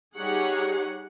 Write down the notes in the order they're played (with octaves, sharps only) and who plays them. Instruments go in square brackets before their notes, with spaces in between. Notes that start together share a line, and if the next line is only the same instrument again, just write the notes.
[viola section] G3 D#4 G4 G#4 C#5 F#5